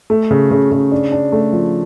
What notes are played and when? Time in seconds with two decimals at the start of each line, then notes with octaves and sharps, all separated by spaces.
0.10 A3
0.31 C#3
0.51 C#3
0.72 C#3
0.92 D4
1.12 D4
1.32 A3
1.53 F3